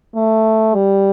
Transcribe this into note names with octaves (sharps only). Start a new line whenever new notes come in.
A3
G3